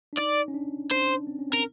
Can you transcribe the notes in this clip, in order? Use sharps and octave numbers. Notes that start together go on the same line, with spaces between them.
D4
D#4 D5
C#4
D4
D4 C5
C4
C#4
C4
A#4